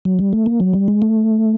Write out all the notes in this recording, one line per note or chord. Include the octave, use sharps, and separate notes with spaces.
F#3
G3
A3
A#3
F#3
G3
G#3
A3